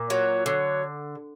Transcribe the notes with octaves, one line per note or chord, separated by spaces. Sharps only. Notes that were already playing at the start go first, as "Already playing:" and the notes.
Already playing: A#2
F#3 C#5
D3 C#5